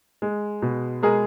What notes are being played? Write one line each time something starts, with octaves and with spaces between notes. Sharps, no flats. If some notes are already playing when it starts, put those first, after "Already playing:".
G#3
B2
G#3 G#4 A#4